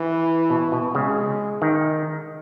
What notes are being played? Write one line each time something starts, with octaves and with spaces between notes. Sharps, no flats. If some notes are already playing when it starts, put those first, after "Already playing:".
Already playing: E3
B2
B2
C#3 G#3
D#3